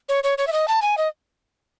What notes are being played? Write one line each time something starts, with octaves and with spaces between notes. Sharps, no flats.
C#5
C#5
C#5
E5
D#5
A5
G#5
D#5